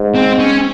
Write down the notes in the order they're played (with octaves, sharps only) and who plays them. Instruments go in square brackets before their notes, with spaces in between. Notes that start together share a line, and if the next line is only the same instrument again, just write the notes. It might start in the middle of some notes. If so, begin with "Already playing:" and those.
Already playing: [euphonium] G#2
[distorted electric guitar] C4
C#4